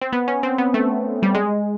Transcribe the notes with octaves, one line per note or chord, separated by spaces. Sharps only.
C4
B3
C#4
C4
B3
A3
G3
G#3